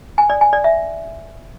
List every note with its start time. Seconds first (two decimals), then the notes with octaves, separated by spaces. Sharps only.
0.18 G#5
0.30 D5
0.41 G#5
0.53 D5
0.64 E5